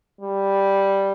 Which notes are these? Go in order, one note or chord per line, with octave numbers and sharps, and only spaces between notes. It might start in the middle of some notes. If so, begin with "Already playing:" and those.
G3